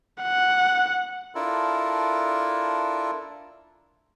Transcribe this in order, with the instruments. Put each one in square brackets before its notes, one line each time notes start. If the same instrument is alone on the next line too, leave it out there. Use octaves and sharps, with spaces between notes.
[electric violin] F#5
[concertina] D4 E4 F4 A4 A#4